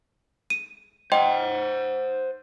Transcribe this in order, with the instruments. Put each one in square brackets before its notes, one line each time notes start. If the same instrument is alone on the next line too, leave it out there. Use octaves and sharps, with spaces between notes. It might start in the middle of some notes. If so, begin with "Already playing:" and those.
[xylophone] D#7
[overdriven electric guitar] C5 F#5 [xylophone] D#5 G5 C6